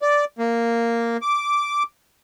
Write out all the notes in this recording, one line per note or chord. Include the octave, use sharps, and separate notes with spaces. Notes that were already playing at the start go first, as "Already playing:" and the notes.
D5
A#3
D6